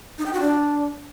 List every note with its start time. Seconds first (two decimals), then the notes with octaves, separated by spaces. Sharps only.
0.18 D#4
0.26 G5
0.33 F#4
0.40 D4